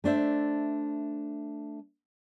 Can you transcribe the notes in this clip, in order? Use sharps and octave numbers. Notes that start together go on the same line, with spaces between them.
A3 D4 C5 E5